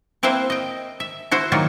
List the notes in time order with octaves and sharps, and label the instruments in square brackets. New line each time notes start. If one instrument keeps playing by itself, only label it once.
[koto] A#3 C4 E4 B4 C5 E5
D#5 G5
E5
E4 F#4 C5
D#3 F#3 A#3 F4